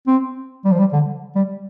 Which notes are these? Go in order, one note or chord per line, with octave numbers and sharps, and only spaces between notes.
C4
G3
F3
G3
D3
G3